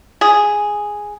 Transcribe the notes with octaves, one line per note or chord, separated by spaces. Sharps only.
G#4